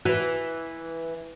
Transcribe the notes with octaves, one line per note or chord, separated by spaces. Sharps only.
E3 F#4 B4